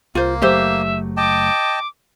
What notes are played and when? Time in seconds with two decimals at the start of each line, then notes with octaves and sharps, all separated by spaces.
0.15 C2 A#3 F4 C5
0.42 F#1 F#3 A3 G4 C5 E5
1.17 D#5 G5 A5 D6